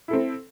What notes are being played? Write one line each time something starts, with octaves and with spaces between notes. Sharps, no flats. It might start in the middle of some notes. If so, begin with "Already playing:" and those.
C4 E4 A4